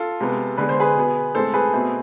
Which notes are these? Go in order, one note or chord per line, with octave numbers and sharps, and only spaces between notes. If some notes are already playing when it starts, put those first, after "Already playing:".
Already playing: F4 A4
C3 G#3 B3
D3 G#3 B3 B4
C5
G#4 B4
B2 B3
A2 G#3 C4 A4 C5
G#4 B4
B2 A3 C4